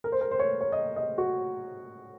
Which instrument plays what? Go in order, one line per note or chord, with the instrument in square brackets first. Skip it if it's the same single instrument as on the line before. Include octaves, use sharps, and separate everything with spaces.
[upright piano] A#4
C5
A#4
C5
C#5
C#5
D#5
D#5
F#4